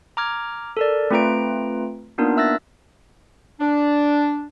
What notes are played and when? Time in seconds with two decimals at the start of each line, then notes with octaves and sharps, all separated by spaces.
0.17 A#5 D6 F6 G#6
0.77 A4 A#4 D5
1.11 A3 C4 F4 B4 A#5 D7
2.18 A#3 B3 D4 D#4 F4 A#4
2.37 E5 E6 F#6 A6 A#6
3.60 D4